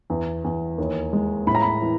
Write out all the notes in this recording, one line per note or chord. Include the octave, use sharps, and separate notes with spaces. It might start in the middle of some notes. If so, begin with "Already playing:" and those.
E2
E2
D#2
G#3
A2 B5
A#5
B5
E3